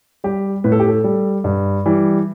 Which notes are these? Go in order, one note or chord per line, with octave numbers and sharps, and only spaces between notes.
G3 G4
A2 B4
A4
G4
A4
G3
G2
E3 G3